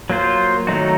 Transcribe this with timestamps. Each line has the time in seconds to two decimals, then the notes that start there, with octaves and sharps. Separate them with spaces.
0.10 F#3 A#3 F4 C5
0.67 D#3 F#3 A3 D#4 F#4